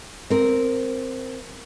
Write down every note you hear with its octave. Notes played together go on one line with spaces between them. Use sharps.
C4 A#4